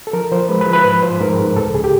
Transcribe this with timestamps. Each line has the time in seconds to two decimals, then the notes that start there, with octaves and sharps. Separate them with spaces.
0.07 A4
0.13 F3 A#4
0.32 F3 C5
0.49 G#3 B4
0.61 B4
0.67 F3
0.73 B4
0.85 G#2 B4
1.03 F3 C5
1.21 G#2 A#4
1.39 G#2
1.57 C#2 A4
1.74 C#2 G#4
1.84 G4